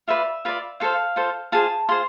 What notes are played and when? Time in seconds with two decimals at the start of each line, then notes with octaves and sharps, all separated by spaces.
0.08 F4 B4 D5 E5
0.45 F4 B4 D5
0.80 F4 A4 C5 F5
1.16 F4 A4 C5
1.52 F4 G#4 C5 A5
1.89 F4 G#4 C5 C6